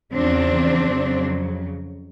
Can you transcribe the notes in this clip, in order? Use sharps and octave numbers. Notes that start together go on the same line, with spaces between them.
E2 C#3 F3 C4 D4
F2 C#3 F#3